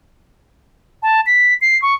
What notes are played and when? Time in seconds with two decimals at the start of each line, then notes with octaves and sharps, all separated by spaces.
1.03 A5
1.26 B6
1.61 C7
1.82 C#6